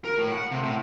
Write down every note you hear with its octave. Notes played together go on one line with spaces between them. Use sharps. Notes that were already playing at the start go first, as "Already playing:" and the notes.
A#4
A2
F#5
C3
A2